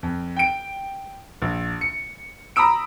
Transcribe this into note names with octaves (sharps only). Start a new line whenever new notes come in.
F2
G5 D7
A#1
C#7
A#5 B5 D#6 E6 D7